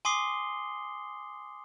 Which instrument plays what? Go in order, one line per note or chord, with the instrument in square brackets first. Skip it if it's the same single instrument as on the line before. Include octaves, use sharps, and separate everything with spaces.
[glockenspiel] G#5 C6 D6 D#6 C7 G7